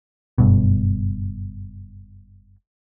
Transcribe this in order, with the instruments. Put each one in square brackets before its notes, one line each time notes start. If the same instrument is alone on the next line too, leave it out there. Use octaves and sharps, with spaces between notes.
[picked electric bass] F#1 G2 B2